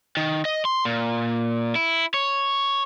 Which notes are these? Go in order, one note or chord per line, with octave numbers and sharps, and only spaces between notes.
D#3
D#5
C6
A#2
E4
C#5